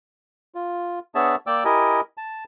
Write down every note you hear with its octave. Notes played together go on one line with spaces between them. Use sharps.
F4
B3 D4 G#4 C#5 E5 A5
A#3 D5 G5 D6 E6
E4 G4 A#4 D#5 G#5
A5